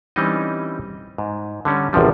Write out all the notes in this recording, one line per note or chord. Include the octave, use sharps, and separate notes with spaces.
E3 G3 C4 C#4 D#4 D#5
G#2
D3 G3 C#4
G#1 E2 C3 F3 G3